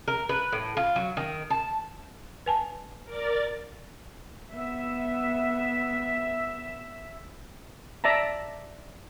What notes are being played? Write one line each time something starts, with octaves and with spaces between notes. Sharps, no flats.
A#4
B4
A2
F4
F#3
D#3
A5
B4 G#5 A5
A#4 D5 A6
B3 E5
D5 E5 A5 A#5